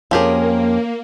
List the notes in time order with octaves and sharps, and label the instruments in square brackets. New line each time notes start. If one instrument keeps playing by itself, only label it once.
[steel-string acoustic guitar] F2 C#4 A#4 [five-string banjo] F3 G4 G#4 [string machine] A#3